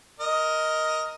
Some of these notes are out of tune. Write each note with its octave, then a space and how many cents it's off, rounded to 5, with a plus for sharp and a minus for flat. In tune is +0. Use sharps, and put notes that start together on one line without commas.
A#4 +0 D#5 +10